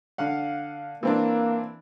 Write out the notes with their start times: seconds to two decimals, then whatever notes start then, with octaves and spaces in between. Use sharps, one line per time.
0.18 D3 F5 F#5
1.03 E3 A#3 C4 D4